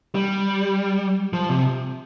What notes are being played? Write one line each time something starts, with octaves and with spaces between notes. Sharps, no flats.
G3
F3
C3